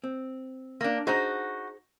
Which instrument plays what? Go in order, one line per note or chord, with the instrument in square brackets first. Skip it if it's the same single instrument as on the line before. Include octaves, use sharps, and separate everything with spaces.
[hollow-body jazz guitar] C4
[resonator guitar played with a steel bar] A#3 D4
[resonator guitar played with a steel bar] D#4 F#4 [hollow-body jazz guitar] G#4 C5 A#5